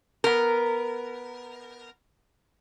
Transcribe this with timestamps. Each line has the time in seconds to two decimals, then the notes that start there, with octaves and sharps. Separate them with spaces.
0.24 B3 A#4